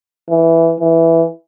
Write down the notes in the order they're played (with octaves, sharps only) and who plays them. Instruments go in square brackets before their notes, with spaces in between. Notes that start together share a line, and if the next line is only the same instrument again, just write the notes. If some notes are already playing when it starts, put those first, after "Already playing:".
[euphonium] E3
E3